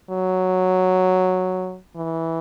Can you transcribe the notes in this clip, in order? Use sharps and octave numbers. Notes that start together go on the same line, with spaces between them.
F#3
E3